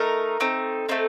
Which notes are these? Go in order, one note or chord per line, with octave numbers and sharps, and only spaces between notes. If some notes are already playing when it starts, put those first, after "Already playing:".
Already playing: A3 D#4 A#4
A3 C4 D#4
A3 C4 D#4